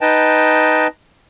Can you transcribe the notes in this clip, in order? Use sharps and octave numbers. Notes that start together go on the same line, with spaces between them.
D#4 B4 D#5 G5 A5